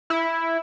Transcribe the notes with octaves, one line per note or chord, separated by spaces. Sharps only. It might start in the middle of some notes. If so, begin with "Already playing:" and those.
E4